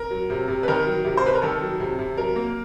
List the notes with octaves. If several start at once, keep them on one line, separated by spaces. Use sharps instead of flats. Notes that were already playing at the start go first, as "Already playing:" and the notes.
Already playing: A#4
F#3
C3
C3
B4
D#3 A#4
F#3
C3
C5
C3 B4
A#4
D#3 A4
F#3
C3
C3
F#3 A#4
A#3